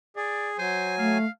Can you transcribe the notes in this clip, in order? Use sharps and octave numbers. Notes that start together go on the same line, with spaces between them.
G#4 D5
F#3 C5 G#5
A3 F5